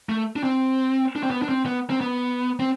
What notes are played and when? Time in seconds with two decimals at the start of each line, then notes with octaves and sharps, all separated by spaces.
0.09 A3
0.36 D4
0.44 C4
1.16 D4
1.23 C4
1.31 B3
1.42 D4
1.49 C4
1.66 B3
1.90 C4
2.01 B3
2.60 C4